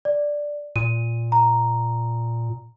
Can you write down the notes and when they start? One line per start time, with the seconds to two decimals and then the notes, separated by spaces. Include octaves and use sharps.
0.05 D5
0.76 A#2 D#7
1.32 A#5